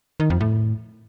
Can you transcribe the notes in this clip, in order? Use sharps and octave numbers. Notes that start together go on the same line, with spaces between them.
D#3
F2
A2